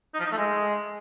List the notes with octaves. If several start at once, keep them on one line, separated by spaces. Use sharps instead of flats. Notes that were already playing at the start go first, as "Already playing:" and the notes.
D#4
F3
D#4
A3
G#3